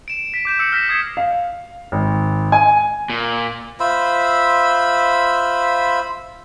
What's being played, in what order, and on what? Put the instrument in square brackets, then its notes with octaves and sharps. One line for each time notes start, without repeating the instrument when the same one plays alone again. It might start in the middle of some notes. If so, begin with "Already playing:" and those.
[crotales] D7 E7
B6 D7
D6 G6 E7
E6 G6 A#6 C#7
F6 A#6 B6 E7
D#6 G#6 C7 C#7 E7
[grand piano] F5
G#1
G#5
[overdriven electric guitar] A#2
[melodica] F4 C5 E5 B5